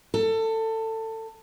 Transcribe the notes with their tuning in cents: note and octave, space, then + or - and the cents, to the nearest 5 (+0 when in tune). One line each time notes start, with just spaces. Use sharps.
A4 +20